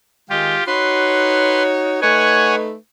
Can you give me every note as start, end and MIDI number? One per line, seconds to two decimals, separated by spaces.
0.30 0.56 51
0.30 0.56 56
0.30 0.63 65
0.30 0.63 67
0.67 2.00 63
0.67 2.00 66
0.67 1.63 71
0.67 2.00 73
0.67 1.63 84
2.02 2.75 57
2.02 2.75 63
2.02 2.75 71
2.02 2.55 73
2.02 2.55 78
2.02 2.55 80